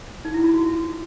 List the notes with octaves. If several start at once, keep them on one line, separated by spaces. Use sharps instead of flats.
D#4
E4
F4
F#4